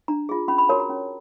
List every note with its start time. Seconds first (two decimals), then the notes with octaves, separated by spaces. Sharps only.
0.08 D4 A#5
0.29 F4 G#4
0.48 C#4 B5
0.58 B5
0.69 F#4 A#4 C#5 A5
0.80 A#5
0.90 C#4